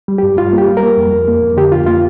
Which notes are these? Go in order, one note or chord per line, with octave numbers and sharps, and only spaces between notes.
G3
G2 G4
G3 F4
A#3
G4
G3
A#4
A#3
F2
F2
A#3
F2
D3 G4
F2 F4
A#3 F4